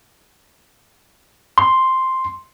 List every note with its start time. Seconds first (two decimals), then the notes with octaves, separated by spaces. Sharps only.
1.58 C6